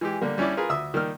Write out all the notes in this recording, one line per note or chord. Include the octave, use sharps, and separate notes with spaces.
E3 G#3 G4
D3 G3 A#3
G3 C#4 D4 E4 D5
F4 G#4 A#4 B4
D2 E5 D#6 E6
D#3 G3 A#3 F6